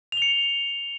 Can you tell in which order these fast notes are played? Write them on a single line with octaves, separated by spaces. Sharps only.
F7 G7 C#7